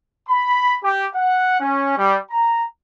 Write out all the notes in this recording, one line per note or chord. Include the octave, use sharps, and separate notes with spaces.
B5
G4
F#5
C#4
G3
A#5